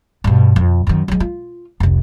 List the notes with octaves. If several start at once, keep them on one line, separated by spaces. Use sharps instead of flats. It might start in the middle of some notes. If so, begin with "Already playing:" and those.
G2 B2
F2
F#2 D#3
F#3 G#3
F4
F1 C2